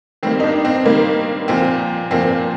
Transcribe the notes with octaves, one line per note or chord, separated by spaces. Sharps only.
D#3 G3 A#3 C4
D#4
D4
C4
D#3 G3 A#3
A#2 F3 A#3 C4
A#2 F3 A#3 C4